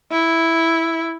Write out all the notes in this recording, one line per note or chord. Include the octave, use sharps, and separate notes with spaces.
E4